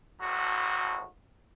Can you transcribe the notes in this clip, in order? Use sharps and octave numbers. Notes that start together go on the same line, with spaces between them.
G#1 D2 A2 F#4